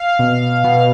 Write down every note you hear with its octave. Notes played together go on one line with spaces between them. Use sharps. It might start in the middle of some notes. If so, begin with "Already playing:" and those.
Already playing: F5
B2
B2